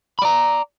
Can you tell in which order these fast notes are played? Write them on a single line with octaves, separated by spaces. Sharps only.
B5 D5 A#5